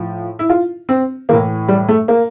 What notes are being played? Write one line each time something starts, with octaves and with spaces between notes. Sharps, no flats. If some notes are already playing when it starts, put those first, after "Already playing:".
Already playing: A2 F3
E4
F4
C4
A2 E3 A#3
G3
A3
A#3